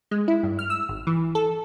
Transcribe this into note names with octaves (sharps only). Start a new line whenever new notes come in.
G#3
E4
G2
F6
E6
G#1
E3
A4